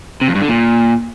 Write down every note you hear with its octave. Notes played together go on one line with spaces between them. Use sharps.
C3
F2
G2
D3
A#2